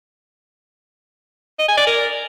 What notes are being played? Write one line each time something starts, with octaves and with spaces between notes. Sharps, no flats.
D#5
G#5
D5
A#4